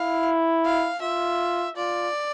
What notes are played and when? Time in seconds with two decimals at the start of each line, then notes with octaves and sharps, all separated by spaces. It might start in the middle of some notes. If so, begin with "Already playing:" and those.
Already playing: E4 F5
0.65 F5
1.02 F4 E5
1.76 F4 D5